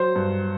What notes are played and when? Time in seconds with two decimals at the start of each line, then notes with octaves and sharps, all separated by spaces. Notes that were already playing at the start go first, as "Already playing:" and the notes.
Already playing: F#3 C5
0.16 G2